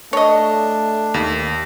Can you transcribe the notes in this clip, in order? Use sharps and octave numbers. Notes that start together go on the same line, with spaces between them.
A3 D4 C#5 D#5
D#2